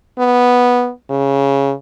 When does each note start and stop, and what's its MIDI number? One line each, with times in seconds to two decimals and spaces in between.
0.19 0.91 59
1.10 1.73 49